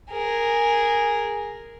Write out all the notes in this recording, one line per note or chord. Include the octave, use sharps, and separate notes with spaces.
G#4 A#4